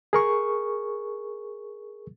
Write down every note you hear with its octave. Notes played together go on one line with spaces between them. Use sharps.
G#4 A#4 C#6